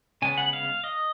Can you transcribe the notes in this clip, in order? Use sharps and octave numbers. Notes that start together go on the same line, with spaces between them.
C#3 G#3 B3 G#5
F#5
F5
D#5